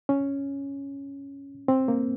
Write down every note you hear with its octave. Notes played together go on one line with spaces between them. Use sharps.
C#4
C4
A#3